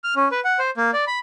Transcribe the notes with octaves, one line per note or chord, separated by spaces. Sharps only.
F6
C#4
B4
F#5
C5
A#3
D5
B5